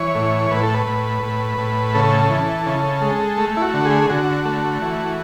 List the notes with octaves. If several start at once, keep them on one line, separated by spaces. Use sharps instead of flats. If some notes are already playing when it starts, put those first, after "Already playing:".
Already playing: E3 C#5
A2
A2 B4
A4
B4
A2
A2
A2
C#3 A4
E3
C#3
G#3
A3
E4
F#4
D3
G#4
D3 F#4
A3
E3